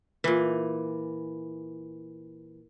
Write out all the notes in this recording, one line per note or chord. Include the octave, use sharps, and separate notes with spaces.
A#2 E3